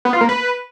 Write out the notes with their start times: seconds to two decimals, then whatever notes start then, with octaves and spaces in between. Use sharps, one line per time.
0.05 B3
0.13 F4
0.21 A#3
0.29 B4